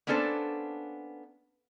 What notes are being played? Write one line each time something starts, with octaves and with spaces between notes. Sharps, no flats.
A#3 B3 C#4 D4 A4 C5